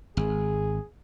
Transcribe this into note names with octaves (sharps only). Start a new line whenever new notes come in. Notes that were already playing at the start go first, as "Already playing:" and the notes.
G#1 G#4